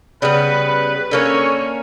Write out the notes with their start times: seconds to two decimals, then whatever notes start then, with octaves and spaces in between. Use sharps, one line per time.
0.22 C#3 G3 B3 B4
0.67 B4
1.11 D3 A#3 C#4 C#5